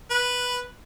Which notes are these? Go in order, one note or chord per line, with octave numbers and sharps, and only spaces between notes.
B4